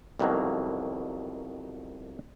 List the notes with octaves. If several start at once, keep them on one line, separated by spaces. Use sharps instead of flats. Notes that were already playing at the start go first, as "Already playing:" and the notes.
C2 F2 B2 D#3 F#3 A#3